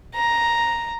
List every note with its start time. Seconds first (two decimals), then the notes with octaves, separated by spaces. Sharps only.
0.15 A#5